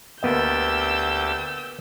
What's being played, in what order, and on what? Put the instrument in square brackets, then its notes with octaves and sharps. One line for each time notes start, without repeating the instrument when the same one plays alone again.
[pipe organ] D2 G4 A6 [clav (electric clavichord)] A#3 B3 D#5 [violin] E6 G6